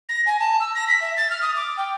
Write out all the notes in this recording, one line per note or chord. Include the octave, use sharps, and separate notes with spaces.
A#6
G#5
A5
E6
A#6
B6
E5
A6
F6
D#6
D6
G5